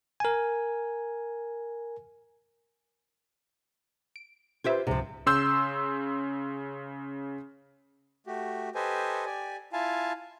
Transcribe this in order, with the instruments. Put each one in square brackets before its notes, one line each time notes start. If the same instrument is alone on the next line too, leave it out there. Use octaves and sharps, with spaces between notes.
[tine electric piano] A#4 G#5
[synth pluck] D7
[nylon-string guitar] F4 G4 C5 [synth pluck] B4 E5 G#6
[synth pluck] C#2 G#2 [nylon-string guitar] C3 F3
[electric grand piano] C#3 C6 E6 G6
[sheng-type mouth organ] A3 F#4 G4
G4 A4 B4 C5 D#5 G#5
G4 D5 G#5
E4 F4 F5 G#5 A5